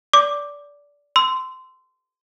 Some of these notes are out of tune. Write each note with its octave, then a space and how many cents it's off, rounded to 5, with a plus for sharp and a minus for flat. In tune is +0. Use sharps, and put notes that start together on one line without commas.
D5 -20 D6 +0
C6 -20 E6 +0